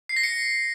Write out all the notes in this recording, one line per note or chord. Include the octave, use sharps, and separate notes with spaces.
C7
A#6
C#7